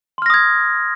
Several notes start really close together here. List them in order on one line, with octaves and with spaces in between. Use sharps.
C6 F6 A#6 D#6 G#6